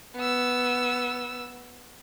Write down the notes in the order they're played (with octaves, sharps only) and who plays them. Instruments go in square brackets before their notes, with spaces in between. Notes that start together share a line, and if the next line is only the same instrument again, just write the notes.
[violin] B3 E6